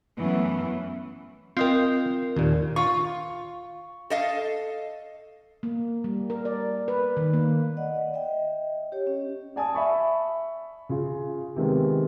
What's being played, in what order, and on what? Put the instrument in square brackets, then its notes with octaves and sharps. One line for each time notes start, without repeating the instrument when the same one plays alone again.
[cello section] F#2 E3 F#3 A3 B3 C#4
[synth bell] C4 A#4 [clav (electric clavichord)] F4 D#5 G5
[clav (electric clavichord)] D#2 A#2
[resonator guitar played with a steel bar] F4 [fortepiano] C#6
[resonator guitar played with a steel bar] A4 D#5 F5
[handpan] A#3
G3
A#4
D5
B4
D#3
A#3
[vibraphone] D5 D#5 F#5
D#5 E5 G5
G4 C#5
C#4
[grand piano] D5 G#5 A5 D#6
E5 B5 C#6
C#3 F4
C3 D#3 G#3 B3